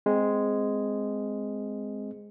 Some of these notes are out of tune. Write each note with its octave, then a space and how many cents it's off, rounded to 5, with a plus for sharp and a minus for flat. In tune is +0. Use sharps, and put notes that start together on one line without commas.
G#3 +0 C4 -10